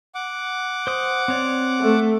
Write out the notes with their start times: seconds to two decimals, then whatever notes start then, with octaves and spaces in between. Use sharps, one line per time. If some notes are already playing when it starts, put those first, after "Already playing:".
0.15 F#5 D6
0.87 C5 D#6
1.28 C4 C#5 D5
1.80 A3